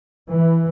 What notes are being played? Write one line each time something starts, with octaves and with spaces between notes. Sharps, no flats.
E3